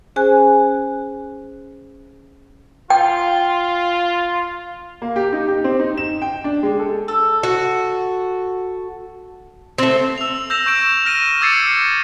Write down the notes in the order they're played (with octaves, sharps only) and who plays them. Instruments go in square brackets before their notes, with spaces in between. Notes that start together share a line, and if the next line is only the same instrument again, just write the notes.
[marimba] C#4 G#4 C5 G#5 F#6
[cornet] F4 [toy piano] G5
[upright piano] A#3
G4
D#4
G4
C4
D#4
E7
G5
D4
G#3
A4
[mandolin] A4
[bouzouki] F#4
A3 C4
[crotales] E6 F7
E6 G6 A#6 E7 F7
C#6 G6 D7 E7
F6 A#6 D7 D#7
D6 E6 G#6 A6 C7 C#7